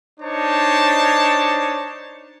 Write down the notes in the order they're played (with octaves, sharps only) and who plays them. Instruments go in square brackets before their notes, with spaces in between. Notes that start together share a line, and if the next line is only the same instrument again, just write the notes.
[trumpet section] D4 D#4 C5 C#5 A5